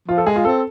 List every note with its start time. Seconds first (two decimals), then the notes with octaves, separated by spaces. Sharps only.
0.08 F3 F4
0.18 A4
0.26 G#3 G#4
0.36 F4
0.45 C4 A4